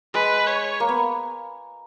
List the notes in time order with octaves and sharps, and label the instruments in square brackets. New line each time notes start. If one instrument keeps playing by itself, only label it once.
[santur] G#3 [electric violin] B4
[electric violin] C#5
[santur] A#3
B3